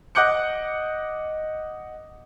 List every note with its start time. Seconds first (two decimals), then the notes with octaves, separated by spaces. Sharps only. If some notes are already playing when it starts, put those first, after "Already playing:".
0.15 D#5 F#5 D6 F#6 G6 C#7